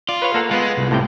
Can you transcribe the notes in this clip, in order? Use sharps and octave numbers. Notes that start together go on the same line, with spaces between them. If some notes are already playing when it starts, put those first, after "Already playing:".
F4 D5
B4 C#5 F5
A#3 A4 F#5
G#3 B3 F4
C2
A2 C3 G5